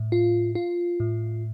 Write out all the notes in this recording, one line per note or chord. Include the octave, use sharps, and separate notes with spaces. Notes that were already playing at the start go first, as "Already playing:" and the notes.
Already playing: A2
F4
F4
A2